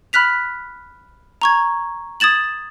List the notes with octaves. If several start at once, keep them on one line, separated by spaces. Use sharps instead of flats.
B5 F6 F#6 B6 F7
A#5 C#6 G#6
D#6 G#6 A6 E7 F#7